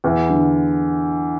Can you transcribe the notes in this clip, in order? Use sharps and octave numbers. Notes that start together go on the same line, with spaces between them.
E2
D3